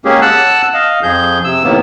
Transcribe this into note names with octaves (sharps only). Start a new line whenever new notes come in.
G#3 A#3 C#4 G4 G#4
F#5 A5 E6 F#6
D#5 F5
F2 F3 G#4 G6
C3 E6
A2 C3 D#3 A#3 B3